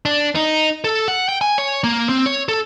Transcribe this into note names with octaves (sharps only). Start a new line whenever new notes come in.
D4
D#4
A4
F#5
G5
G#5
C#5
A#3
C4
C#5
A4